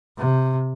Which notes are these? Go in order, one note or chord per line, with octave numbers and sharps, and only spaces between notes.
C3